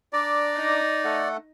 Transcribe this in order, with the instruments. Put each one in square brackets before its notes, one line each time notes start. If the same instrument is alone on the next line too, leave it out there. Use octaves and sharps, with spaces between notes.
[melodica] D4 A#5 D6 [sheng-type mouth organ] D5
[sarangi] D#4
[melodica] A3 A4 F#5